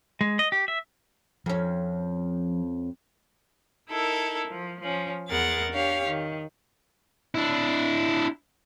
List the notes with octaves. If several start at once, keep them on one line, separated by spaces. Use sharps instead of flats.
G#3
D#5
G4
E5
F2 F3 C#4
D#4 E4 A4 A#4
F3
F3 C#4
E2 B3 G#4 A#4 F#5 A6
D4 G4 C#5 F5
D#3
D4 E4